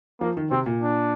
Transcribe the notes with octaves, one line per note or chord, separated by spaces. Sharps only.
F3 A#3
D#3
C3 C4
A#2
D4